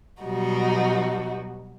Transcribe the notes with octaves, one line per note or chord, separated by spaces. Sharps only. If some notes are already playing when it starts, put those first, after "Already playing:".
B2 F#3 G3 D#4 F#4